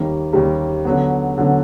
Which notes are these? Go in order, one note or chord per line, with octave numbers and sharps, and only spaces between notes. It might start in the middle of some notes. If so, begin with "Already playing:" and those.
Already playing: D#2 D#3 G3 A#3
D#2 D#3 G3 A#3
D3 F#3 B3
D3 F#3 B3